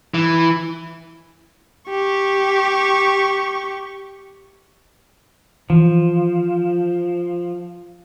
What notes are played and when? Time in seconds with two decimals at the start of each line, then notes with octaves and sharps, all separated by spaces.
0.14 E3
1.90 G4 C#6
5.70 E3 F3